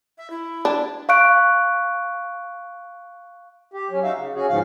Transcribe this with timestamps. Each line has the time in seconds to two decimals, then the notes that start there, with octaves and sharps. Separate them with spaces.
0.18 E5
0.30 E4
0.65 D4
1.09 F5 C#6 F#6 D7
3.74 G4
3.90 F#3 C#4
4.03 D#4 F#4 E5 F5
4.16 C#3
4.35 C#4 F#4 G#4
4.49 D2 G#2 C#3 F3 C#4 F5